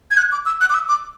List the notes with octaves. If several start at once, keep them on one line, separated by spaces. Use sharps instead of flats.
G#6
F#6
D6
E6
F#6
D6
E6
D6